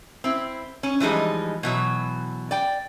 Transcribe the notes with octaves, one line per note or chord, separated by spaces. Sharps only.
C4 E4
C#4
E3 F3 G3 G#3 D#4
B2 E3 F#3
D5 G5